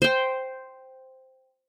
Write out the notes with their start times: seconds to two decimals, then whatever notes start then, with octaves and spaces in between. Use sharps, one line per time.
0.02 C5 G5